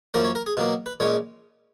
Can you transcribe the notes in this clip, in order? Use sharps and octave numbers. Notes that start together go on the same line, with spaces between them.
F#2 F3 A#3 C#4 A#4
C#5
A#4
G#4
B2 F#3 A#3 F4
B4
A#1 A#2 G#3 C#4 C#5